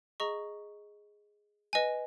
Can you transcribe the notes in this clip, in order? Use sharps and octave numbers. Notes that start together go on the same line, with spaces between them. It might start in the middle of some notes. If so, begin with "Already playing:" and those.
G#4 D#5 A#5 C#6
B4 D#5 G#5